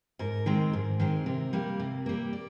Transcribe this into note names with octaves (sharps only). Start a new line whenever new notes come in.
G#2 A#4
D#3 G#3 C4
G#2
D#3 G#3 C4
C3 A#4
G3 A#3
C3
G3 A#3
D5